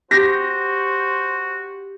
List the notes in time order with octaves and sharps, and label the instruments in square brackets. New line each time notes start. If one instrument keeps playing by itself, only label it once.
[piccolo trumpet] F#4 [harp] G4 [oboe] C5 [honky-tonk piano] A#6